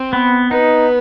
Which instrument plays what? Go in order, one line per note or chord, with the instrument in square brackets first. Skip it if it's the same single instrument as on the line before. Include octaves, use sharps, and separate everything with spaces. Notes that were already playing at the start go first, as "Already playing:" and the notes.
Already playing: [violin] C4
[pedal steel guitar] B3
[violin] B3 [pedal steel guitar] D#4